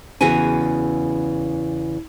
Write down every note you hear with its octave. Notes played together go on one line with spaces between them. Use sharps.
E2 C#3 E4 F#4 B4 G#5